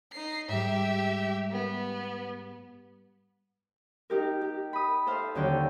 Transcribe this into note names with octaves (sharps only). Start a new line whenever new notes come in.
D#4 C7
G#2 G3 G4 E5
B3
D#4 G4 A#4
G4
B5 D#6
A4 C5 F5
D#2 D3 F#3 C#4 D5 G5